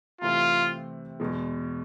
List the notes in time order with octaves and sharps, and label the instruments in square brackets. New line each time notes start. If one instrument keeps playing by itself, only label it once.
[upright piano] C3 E3 A3 C4 [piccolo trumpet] F4
[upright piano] E2 B2 G#3